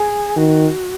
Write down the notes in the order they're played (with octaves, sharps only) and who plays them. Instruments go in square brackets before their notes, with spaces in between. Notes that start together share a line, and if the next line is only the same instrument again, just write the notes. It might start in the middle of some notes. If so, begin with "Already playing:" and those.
Already playing: [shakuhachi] G#4
[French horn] D#3 [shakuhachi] F#4